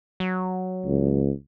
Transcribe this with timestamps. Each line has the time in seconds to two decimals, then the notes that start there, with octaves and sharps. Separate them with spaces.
0.20 F#3
0.85 C#2